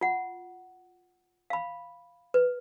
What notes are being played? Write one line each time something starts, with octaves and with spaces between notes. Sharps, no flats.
F4 F#5
F5 B5
B4